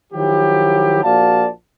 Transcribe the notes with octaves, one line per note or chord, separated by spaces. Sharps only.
D#3 F3 F#3 E4 G4
A#1 A#2 F#4 D5 F5 A5